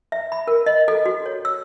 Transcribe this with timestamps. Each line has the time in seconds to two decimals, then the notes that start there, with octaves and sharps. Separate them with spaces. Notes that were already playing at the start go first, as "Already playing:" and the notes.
0.12 E5
0.32 B5
0.48 A#4
0.66 D#5
0.88 A4
1.06 F#4
1.26 C#5
1.45 E6